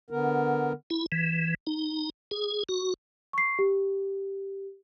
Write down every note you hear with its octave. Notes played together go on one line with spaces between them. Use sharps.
D3 B3 A#4
E4
E3
D#4
G#4
F#4
C#6 C7
G4